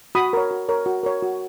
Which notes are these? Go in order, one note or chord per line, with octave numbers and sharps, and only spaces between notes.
F#4 B5 D#6
A#4 C#5
F#4
A#4 C#5
F#4
A#4 C#5
F#4